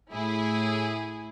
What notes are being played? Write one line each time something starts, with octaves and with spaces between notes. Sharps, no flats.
A2 E4 G#4